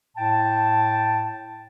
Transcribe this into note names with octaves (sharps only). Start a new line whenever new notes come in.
A2 G5 A5